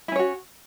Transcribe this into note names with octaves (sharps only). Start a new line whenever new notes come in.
C#4 E4 F#4 C#5